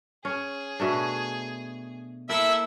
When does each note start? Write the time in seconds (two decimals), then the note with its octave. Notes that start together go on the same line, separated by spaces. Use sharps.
0.25 C#4 G#4
0.80 B2 A3 D4
2.30 A#3 E4 A4 E5 E6